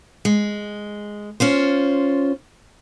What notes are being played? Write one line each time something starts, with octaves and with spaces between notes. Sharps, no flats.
G#3
C#4 F4 C5